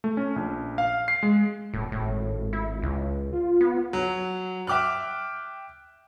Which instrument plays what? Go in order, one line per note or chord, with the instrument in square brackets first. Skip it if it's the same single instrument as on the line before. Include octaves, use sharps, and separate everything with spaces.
[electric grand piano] A3
C#4
A#1
F5
C7
G#3
[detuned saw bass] D#1 [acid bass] A2
[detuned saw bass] G#1 [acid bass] A2
[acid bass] E4
C#2
[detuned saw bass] F4
[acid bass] B3
[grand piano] F#3
E5 G5 D6 F6 F#6